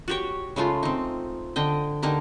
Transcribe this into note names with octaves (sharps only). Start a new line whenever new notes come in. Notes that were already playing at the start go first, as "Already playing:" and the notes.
F#4 G4 C#5
C#3 G#3 A3 F4
C4 D#4
D3 D#5 G5
D3 A#3 D#4 G4